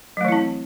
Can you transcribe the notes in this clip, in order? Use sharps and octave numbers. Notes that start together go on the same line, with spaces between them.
E3 F#3 A3 C4 E4